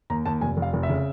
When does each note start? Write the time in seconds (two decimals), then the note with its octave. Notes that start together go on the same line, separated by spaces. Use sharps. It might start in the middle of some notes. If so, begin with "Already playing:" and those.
0.10 D#2 A#5
0.26 D#2 A5
0.41 F1 G#5
0.57 F1
0.62 F5
0.73 F1
0.83 E5
0.89 C#3